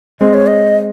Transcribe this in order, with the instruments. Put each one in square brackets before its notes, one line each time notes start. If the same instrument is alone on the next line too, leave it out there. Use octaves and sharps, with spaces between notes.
[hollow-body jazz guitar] G#3 C4 [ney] D#5
[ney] C#5
D#5